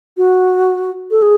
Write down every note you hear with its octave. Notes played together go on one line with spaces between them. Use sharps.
F#4
A4
G#4